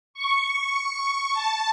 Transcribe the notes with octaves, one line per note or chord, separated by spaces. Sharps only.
C#6
A5